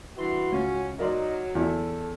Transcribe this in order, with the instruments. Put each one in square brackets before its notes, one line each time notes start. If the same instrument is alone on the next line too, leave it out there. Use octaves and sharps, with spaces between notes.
[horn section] G2 E3 C6 [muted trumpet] F#4
[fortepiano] C#2 [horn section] C#4
[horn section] F#3 [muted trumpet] D#4 [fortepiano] A#4 D5 C6
[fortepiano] E2 E4 [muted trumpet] A4